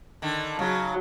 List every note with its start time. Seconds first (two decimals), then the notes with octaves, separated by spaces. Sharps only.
0.22 D3 D#3
0.59 C#3 F#3